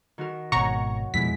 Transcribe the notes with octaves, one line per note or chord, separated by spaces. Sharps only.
D#3 F#4 A#4
G#1 B2 C#5 F#5 A#5 C#6
F2 B2 G#3 E4 B6